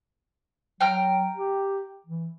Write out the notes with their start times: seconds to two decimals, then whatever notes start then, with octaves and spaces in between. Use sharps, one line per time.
0.81 F#3 G5 A#5 F6
1.36 G4
2.07 E3